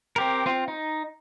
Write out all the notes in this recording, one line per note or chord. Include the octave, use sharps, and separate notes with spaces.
C4 G4 A#4
C4 F4
D#4